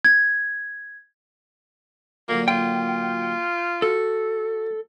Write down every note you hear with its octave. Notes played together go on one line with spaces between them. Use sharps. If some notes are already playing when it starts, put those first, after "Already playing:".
G#6
A#2 D3 F#3 A#3
F4 G5
F#4 A4